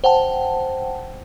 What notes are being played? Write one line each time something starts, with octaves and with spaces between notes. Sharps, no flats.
C5 F#5 G5 A5